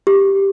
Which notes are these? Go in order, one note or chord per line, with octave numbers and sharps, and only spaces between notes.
G4